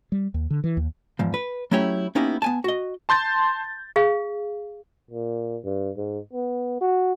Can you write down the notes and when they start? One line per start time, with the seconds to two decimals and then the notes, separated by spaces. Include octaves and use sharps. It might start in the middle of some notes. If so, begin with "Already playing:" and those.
0.12 G3
0.34 D#2
0.50 D3
0.64 E3
0.77 D#2
1.19 E2 G#2 F3
1.34 B4
1.71 F#3 A3 C#4 E4 G4 C#5
2.15 A#3 B3 C#4 D#4 E4 G4
2.42 B3 G#5 A5
2.64 F#4 D#5
3.09 A5 C6 G6 A6
3.96 G#4 F5
5.11 A#2
5.64 G2
5.97 G#2
6.33 B3
6.81 F#4